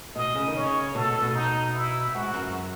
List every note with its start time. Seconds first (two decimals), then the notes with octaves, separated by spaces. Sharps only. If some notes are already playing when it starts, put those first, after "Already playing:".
0.16 B2 D#5
0.35 C#3
0.47 D#3
0.55 C#3 C#5
0.94 B2 A4
1.08 B2
1.22 B2
1.35 D#4
1.74 E4
2.14 G#2 F#4
2.33 F#2